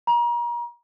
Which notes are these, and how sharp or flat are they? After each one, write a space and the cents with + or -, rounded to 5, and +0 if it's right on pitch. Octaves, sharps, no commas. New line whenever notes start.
A#5 +35